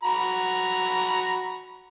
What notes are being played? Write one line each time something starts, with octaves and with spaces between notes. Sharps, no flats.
F#4 A#5 B5